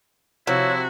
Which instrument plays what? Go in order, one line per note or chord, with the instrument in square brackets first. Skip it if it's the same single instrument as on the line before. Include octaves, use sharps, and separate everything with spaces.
[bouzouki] C3 [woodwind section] F3 E4 [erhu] F#4 [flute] C#5